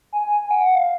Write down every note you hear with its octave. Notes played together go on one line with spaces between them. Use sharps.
G#5
G#5
F#5
F#5
F5